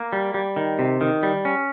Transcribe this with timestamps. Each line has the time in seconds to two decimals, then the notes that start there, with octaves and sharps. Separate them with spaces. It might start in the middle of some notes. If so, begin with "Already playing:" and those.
Already playing: A#3
0.13 G3
0.34 G3
0.56 D#3
0.79 C3
1.01 D#3
1.23 G3
1.45 C#4